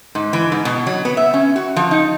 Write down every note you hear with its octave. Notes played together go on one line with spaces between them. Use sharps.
G#2
E3
G#2
B2
F#3
B3
E5
C#4
F#4
F3
D#4